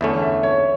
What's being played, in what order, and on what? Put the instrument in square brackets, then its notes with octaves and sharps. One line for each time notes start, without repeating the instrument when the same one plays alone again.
[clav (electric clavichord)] E2 D3 A3 C#4 [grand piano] E5
[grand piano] E5
C#5